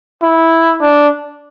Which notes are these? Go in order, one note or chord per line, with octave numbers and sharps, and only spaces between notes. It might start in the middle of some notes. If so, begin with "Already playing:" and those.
E4
D4